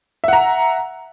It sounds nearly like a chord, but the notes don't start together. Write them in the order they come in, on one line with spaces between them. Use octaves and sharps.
E5 F#5 A#5